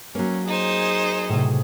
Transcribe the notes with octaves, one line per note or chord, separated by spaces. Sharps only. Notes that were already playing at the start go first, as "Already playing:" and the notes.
F#3 A#3 C#4
D#4 G#4 C5
A2 C3